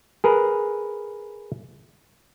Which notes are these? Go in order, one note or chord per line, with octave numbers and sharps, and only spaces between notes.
G#4 A#4 B4